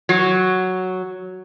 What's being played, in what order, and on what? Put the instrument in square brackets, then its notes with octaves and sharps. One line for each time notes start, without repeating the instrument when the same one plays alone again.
[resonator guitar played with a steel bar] F#3